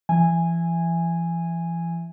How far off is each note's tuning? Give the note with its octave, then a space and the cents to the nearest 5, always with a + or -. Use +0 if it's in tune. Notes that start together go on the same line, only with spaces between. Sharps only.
E3 +40 E5 +5 G#5 -10